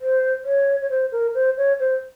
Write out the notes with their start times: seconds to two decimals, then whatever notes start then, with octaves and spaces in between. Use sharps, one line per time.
0.01 C5
0.45 C#5
0.81 C#5
0.90 C5
1.12 A#4
1.34 C5
1.57 C#5
1.80 C5